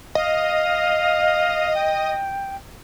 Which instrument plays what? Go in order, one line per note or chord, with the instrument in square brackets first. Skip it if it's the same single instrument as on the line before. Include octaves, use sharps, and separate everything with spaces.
[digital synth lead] D#5 [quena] F5
[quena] G5